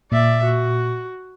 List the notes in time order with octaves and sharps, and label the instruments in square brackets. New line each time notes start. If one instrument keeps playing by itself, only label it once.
[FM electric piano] A#2 [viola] D5 E5
[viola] F#4